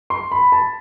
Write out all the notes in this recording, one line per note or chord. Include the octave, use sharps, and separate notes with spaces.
C6
B5
A5